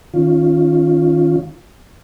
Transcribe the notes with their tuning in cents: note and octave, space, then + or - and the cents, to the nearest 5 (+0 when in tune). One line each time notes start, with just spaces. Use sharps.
D#3 +5 C#4 +0 F4 +0